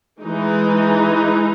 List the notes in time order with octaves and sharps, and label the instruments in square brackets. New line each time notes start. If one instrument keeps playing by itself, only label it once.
[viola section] E3 G#3 D#4